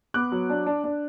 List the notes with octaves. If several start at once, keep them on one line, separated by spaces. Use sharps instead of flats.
B3 D6 F#6
F#3
D4
D4
D4